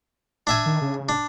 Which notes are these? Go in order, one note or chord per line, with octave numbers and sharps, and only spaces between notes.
D4 E5 G#5
D#3
C#3
D4